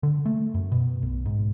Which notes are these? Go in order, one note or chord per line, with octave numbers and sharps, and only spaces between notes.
D3
A3
F#2
B2
B1
G#2